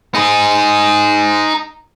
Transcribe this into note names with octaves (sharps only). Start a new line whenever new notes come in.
D#4 G#4